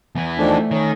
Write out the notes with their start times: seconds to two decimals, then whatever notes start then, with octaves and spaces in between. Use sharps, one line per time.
0.15 E2 E3
0.38 D#3 F3 A3 D4
0.71 D#3 C#4